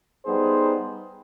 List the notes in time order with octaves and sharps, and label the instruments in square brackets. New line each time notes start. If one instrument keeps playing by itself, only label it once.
[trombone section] G3 B3 D#4 G#4 C5